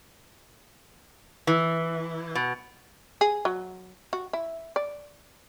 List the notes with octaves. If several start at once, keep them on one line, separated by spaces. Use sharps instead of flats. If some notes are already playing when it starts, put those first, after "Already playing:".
E3
B2
G#4
F#3
F#4
E4
D5